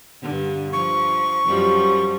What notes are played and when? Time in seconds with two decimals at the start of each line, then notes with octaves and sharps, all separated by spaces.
0.22 G2 D3
0.73 F3 C#6
1.46 F#2 F3 G3